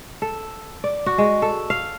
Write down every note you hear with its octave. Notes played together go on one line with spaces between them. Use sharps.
A4
D5
F#4
G#3
A4
F5